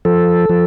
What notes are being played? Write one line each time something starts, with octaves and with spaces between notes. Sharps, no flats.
F3 A4
F3